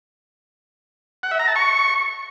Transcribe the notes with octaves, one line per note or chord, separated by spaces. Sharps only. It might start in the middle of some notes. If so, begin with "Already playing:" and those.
F#5
E5
A#5
A5
C#6